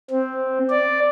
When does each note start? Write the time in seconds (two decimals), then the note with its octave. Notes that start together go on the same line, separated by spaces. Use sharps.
0.11 C4
0.70 D5